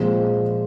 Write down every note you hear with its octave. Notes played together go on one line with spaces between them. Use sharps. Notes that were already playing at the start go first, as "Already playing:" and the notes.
Already playing: A#2 F3 G#3 C4